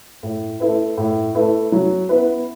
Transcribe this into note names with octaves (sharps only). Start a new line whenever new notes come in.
A2
A3 E4 B4
A2
A3 E4 B4
F#3
B3 E4 B4